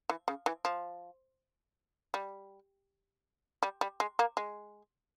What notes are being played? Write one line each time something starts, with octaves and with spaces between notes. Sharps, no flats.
E3
C#3
E3
F3
G3
G3
G3
G#3
A#3
G#3